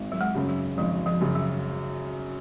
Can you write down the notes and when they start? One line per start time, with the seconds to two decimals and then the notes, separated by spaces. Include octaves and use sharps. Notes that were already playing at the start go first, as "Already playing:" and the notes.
Already playing: G#1
0.12 F#3
0.21 G#3
0.34 F#2 C#3
0.49 F#3
0.78 G#1 F3
1.06 F3
1.21 F#2 C#3
1.35 F#3